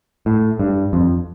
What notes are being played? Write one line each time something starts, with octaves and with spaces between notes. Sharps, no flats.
A2
G2
F2